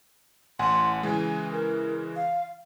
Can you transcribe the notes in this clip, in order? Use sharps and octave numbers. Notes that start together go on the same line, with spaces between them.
A1 F#5 G#5 C6
C#3 E3 G#3 G#5
A#4
F5